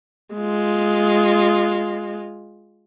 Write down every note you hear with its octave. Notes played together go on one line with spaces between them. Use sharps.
G#3 F4